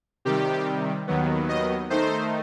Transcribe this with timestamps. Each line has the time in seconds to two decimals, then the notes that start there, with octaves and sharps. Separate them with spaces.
0.25 C3 D#3 G3 G4
1.07 D#2 D#3 F#3 B3
1.49 D#5
1.90 D#3 A3 D#4 C5